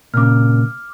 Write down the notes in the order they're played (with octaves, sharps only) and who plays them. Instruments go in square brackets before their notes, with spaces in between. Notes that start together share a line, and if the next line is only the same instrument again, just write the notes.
[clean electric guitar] A#2 C#3 [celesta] D6 F6